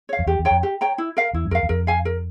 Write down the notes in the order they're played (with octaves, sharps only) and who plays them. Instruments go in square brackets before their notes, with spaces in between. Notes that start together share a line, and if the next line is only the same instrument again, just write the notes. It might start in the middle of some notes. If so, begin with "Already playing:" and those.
[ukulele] C#5 F5
[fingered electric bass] F2
[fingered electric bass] E2 [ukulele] G4
[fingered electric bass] E2
[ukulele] C#5 G5 A#5
[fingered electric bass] F2
[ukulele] G4
C#5 G5 A#5
E4
A#4 F5
[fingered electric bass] E2 [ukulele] E4
[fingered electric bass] G2
[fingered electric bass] F2 [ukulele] A#4 F5
[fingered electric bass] E2
[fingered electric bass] F2 [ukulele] A#4
[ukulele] F5 G#5
A#4